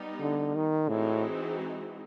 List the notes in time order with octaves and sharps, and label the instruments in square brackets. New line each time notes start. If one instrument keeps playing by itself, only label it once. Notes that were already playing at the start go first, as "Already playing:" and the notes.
Already playing: [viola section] G3 B3 D#4
[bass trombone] D3
D#3
[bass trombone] A2 [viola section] E3 G#3 C4 D#4 F#4